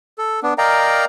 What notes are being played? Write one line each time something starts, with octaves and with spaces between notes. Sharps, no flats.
A4
B3 D4
A#4 D5 D#5 F5 G5 A#5